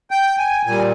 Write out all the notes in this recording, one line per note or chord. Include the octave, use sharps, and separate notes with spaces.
G5
G#5
A#2 G3 G#5